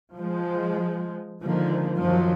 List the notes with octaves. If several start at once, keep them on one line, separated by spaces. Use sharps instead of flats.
F3 G#3
D3 D#3 F3 G#3 A#3
F#2 D#3 F3 F#3